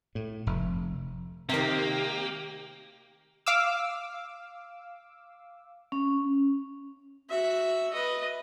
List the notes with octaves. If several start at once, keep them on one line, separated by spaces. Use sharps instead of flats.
A2
F1
C3 D#3 A#3 G4
F5 D6 E6
C#4
F#4 E5
B4 D#5